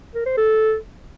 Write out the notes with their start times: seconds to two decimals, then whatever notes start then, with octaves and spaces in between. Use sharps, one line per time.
0.14 A#4
0.26 C5
0.37 A4